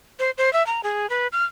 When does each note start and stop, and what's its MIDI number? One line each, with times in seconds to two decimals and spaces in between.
0.19 0.31 72
0.38 0.52 72
0.53 0.65 76
0.67 0.81 82
0.83 1.09 68
1.10 1.27 71
1.32 1.44 89